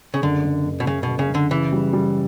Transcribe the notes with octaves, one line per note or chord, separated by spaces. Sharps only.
C#3
F#1 D3
F#1
F#1
B2
F#1 C#3
F#1 B2
C#3
F#1
D3
C#3 E3
G3
G3